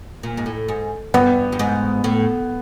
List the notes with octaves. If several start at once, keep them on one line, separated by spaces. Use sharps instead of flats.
A#2
G#2
A2
G#2
G2 B3
G2
G#2
A2